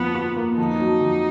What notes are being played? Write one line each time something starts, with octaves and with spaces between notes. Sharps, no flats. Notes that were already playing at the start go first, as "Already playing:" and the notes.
Already playing: F2 F3 A#3 B3
F4
A#3
F2 D#4
F#3
F2